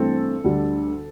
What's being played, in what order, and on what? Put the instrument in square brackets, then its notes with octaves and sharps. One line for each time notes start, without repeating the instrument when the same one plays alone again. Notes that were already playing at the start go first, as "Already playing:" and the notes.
Already playing: [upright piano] G2 E3 A3 C4 [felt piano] A4
[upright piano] D2 D3 G3